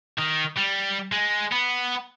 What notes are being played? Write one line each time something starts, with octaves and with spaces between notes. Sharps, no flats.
D#3
G3
G#3
B3